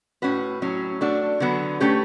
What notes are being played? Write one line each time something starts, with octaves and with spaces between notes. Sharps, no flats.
A2 G3 C#4 F#4 B4
A2 F#3 C#4
A3 D4 F#4
D3 F#3 B3 F#4 B4
A3 C#4 G4 B4